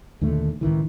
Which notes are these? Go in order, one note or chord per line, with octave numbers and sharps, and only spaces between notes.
D#2 A#2 D3 A3
C#2 A2 D#3 E3